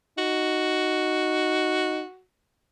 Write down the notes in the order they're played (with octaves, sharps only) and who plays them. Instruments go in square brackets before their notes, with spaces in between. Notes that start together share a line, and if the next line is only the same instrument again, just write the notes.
[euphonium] D#4 [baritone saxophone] F#4